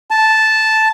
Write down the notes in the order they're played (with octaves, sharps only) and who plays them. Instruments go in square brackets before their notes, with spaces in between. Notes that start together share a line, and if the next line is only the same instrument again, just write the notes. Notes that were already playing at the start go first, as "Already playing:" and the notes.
[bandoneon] A5